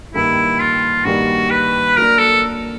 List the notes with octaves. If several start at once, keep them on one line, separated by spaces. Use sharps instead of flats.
G2 D#3 G3 A#3 E4
F4
G2 D#3 G3 A#3 F#4
B4
F#3 A#3 D4 A#4
A4